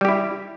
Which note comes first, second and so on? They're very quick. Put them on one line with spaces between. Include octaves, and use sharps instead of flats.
G3 G4 E4